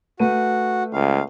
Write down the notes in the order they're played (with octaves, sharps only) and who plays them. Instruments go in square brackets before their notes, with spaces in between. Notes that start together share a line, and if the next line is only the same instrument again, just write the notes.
[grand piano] A3 B4 D#7 [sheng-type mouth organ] F#4
[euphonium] C#2 [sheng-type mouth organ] F5